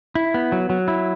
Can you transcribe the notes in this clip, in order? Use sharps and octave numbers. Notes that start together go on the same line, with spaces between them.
E4
B3
F#3
F#3
E4